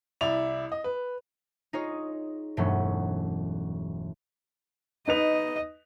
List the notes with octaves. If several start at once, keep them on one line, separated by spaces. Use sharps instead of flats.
C2 E4 D5 F7
D#5
B4
D#4 F4 G#4 C#5 D#5
E1 G2 F#3 A3 C#4
D#4 B4 D#5 F7